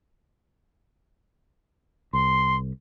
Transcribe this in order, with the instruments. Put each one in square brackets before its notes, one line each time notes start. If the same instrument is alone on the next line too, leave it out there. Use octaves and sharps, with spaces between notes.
[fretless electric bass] C2 [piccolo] C6